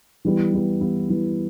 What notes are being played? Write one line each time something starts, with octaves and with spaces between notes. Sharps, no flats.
E3 G3 B3 E4
E3 G3 B3 E4
E3 G3 B3 E4
E3 G3 B3 E4